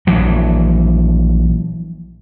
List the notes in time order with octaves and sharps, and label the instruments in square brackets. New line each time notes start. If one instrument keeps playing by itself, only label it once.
[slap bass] A#1 E3 F#3